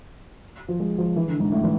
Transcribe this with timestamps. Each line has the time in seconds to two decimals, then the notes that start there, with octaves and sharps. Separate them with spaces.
0.69 F3
0.80 G#3
0.98 F3
1.16 E3
1.28 D3
1.40 G#2
1.52 A2
1.64 E3